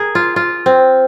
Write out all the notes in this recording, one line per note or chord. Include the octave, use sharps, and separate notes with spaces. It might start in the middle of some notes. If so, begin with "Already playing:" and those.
Already playing: G#4 A#4
F4
F4
C4